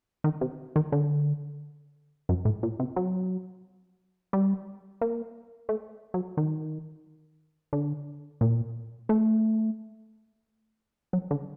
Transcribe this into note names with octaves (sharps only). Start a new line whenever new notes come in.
D#3
C3
D#3
D3
F#2
A2
A#2
C3
F#3
G3
A#3
A3
F#3
D#3
D3
A#2
A3
F#3
D3